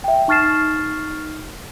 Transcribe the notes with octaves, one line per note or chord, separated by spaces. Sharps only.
E5 G5
D#4 C#6 F6 A6 C7 E7